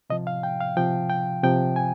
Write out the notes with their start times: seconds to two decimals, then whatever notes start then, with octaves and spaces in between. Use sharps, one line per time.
0.10 C3 F3 D#5
0.27 F5
0.43 G5
0.61 F5
0.77 C3 F3 G5
1.10 G5
1.43 C3 F3 G5
1.76 G#5